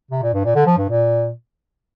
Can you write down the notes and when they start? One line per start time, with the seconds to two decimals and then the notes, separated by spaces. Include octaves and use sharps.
0.11 C3
0.22 A#2
0.33 G2
0.45 A#2
0.56 D3
0.67 F3
0.78 G2
0.89 A#2